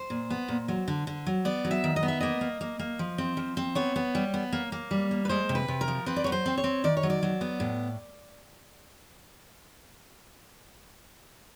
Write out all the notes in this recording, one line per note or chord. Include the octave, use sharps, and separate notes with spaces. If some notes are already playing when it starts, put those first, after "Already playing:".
Already playing: C5
A#2
B3
A#2
F#3
D3
D3
F#3
B3 D5
F#3
E5
D#3
D#5
B3
E5
A#3 D#5
A#3
A#3
A#3
F3
C4
F3
C4
B3 C#5
B3
G3
B3
A#3
A#3
G3
A#3
B4
G#3 C5
C3
B4
C3
A#4
F3
C4 B4
D5
F#3 C#5
C5
C4
C#5
C4
D#3 D5
C#5
F#3
D5
F#3
B3
A2